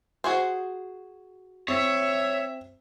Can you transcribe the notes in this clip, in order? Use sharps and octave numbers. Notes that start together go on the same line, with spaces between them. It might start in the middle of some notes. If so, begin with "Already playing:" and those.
F#4 G#4 C5
C4 C#5 E5